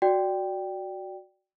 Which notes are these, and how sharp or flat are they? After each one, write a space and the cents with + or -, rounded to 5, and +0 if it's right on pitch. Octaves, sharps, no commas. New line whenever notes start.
F#4 +0 D5 +0 G5 +0